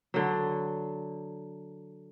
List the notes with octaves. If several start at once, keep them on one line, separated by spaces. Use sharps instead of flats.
D3 F#3